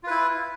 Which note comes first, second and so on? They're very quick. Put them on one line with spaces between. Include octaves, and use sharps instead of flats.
F4 B4 E4